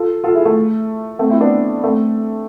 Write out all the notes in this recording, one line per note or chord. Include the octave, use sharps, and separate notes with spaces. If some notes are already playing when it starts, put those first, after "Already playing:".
Already playing: F4 A4
F4 A4
E4 G#4
A3
A3 C4
C4 E4
B3 D4
A3 C4